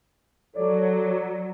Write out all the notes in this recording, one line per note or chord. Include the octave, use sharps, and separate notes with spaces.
F#3 A4 C#5 D5